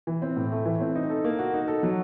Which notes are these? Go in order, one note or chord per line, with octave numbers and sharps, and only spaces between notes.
E3
C4
A2
A3
E3
C4
D#4
A4
A#3
F#4
D#4
A4
F#3